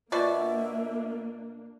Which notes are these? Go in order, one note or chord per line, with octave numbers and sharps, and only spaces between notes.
B2 A#3 D4 F4 F#4 D5 E5